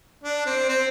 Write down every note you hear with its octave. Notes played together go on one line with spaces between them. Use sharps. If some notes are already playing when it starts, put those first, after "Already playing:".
D4
C4
C4